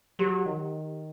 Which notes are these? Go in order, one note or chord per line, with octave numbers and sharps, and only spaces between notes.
F#3 G4
D#3